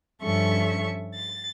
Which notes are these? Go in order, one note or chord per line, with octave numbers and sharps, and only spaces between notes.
G2 F3 C#4 A4 E5 C#6
A6